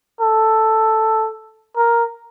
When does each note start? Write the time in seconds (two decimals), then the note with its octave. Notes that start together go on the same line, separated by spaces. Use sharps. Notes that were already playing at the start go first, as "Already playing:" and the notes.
0.21 A4
1.77 A#4